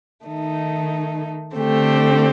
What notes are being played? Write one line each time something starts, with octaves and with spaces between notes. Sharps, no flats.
D#3 A3 D#4
D3 A3 C4 G4